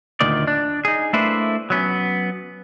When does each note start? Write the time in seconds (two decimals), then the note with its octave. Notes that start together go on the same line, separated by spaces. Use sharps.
0.21 D2 A#2 D#3 D5
0.47 D4
0.85 D#4 G#4
1.13 A3 A#3 D4 E4 B4 C5
1.70 F#3 B3 C#4